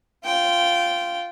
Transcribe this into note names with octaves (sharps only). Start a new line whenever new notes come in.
F4 G5